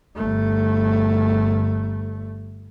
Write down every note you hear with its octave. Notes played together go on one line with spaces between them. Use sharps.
G1 A3